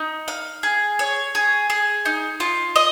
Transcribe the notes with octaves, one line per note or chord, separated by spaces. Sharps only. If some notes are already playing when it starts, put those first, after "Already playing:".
Already playing: D#4
F5
G#4
C#5
G#4
G#4
D#4
F4
D#5